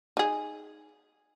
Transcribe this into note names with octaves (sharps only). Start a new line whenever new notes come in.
D#4 G#4